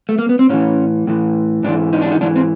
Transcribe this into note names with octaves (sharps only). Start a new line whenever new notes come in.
A3
A#3
B3
C4
A2 E3 C#4
A2 E3
G#2 E3 D4
D#4
D4
D#4
G#2 E3 D4
C4